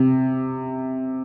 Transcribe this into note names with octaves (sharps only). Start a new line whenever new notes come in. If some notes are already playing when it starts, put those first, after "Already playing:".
Already playing: C3